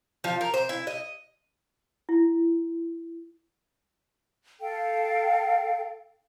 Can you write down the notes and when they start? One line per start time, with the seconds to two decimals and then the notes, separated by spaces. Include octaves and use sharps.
0.24 F3
0.41 A#4
0.54 C5
0.69 E4
0.87 D#5
2.09 E4
4.60 A4 F5 G5